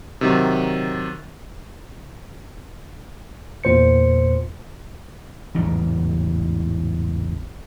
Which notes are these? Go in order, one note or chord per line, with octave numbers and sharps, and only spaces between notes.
C3 D#3 F#3
E2 A#2 C5 C#7
A1 E2 G#2 C#3